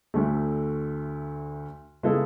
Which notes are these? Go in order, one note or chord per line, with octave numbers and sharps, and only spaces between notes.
D2 D3 A3
C#3 G#3 B3 E4 A4